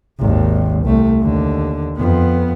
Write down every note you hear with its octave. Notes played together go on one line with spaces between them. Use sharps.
G#1 D#2
C2 A3
D#2 D3
F2 B3